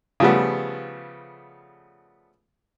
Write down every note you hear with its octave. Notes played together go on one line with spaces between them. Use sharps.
C#3 F3 G3 A3 B3